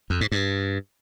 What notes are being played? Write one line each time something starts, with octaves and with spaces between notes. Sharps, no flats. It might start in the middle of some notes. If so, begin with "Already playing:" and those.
F2
G#2
G2